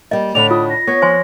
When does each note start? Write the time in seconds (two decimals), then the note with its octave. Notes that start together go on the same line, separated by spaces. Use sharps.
0.11 G3 A#3 D#5
0.35 A2 D3 D5 B5 F7
0.51 F4 D#6
0.70 A#6
0.87 B3 C#5
1.02 F3 C5 G#5 C6